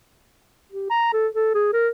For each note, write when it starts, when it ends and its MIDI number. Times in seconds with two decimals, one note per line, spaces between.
0.72 0.89 67
0.90 1.10 82
1.13 1.27 69
1.35 1.52 69
1.55 1.70 68
1.73 1.89 70